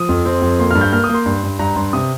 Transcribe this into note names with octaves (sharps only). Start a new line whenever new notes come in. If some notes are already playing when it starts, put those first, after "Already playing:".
Already playing: F3 D#6
F2
C4
F2
A#3 C6
G2 F6
G6
A#3 F6
D#6
A#3
C6
G2
G2
G2 A#5
G2 C6
C3 D#6